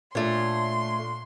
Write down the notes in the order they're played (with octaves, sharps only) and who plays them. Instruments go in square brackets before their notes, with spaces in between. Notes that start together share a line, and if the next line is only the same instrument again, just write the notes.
[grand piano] A#2 D4 [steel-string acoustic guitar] A3 C#5 [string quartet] C6